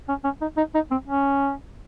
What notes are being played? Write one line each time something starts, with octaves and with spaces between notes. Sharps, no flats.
C#4
C#4
D#4
D#4
D#4
C4
C#4